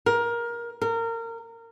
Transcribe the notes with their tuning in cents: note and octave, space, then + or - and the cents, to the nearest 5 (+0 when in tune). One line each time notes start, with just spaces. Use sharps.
A#4 +20
A#4 -25